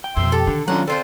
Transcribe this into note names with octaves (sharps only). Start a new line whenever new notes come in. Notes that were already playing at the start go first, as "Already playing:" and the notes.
G5
F2 B2 E5 C6 E6
G4 A4
D3 D#3
D3 F#3 C#4 F4 A4 F#5 A#5
D3 C4 F4 A4 C5